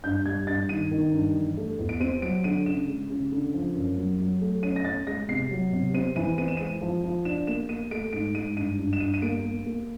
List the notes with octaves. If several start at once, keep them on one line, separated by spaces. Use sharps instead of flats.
G2 G6
G3 G#6
G2 A6
D#3 D#7
D#3
G2
E3
A3
E2
D7
C4 D#7
F#3 D7
D3 D#7
C#3 E7
G#3
C#3
D3
F3
F#2
F#3
F#3
A3
C#4 D#7
A#6
C#4 A6
G#3 A#6
C3 C7
F#3
C3
C4 D#7
E3 D#7
C4 D#7
E7
G#3 D#7
F3
F3
D4 E7
A#3 E7
A#3 D#7
A3 D7
G#2 D7
G#2 D#7
G2 D#7
G2
E7
G2 D#7
D#7
A#3 D7
A#3
A#3